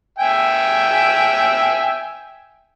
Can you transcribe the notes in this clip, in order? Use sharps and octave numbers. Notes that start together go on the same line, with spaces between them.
E5 G5 G#5